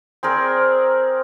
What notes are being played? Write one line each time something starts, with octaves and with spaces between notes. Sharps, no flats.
C4 G#4 A#4 D5